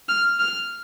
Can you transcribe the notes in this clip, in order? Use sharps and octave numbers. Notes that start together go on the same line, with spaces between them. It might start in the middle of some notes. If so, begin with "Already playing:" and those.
F6
F6